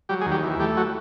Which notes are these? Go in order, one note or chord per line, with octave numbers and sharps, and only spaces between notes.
F#3 G3 G4
G#3 G#4
D#2
G3 G4
E3
G3 A3 G4
F#3 F#4